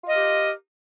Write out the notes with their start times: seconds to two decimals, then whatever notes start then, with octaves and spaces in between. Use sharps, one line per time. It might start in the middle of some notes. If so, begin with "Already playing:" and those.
0.03 F4
0.07 D#5
0.11 A#4
0.15 G4